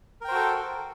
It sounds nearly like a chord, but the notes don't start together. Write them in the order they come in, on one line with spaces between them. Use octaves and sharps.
A#4 G5 C5 F#4 A4